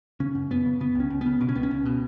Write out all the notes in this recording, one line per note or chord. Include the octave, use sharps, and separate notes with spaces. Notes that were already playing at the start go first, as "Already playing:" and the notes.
C#3 C#4
F#2
F#2 B3
C#3
C#3 B3
C#2 C#4
C#2
C#3 B3
B2
C#4
C#2 B3
C#4
C#2
B2